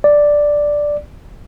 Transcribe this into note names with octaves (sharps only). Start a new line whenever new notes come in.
D5